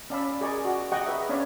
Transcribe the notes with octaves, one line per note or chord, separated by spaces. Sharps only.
C#4 D5 F5 A5 B5 E6
G#4 A#4 D5 D#5 G#5 C#6
F#4
G4 D#5 F#5 G5 A#5 C#6
G#4 B4 D#5 E5
C#4 D4 C#5 D5 F5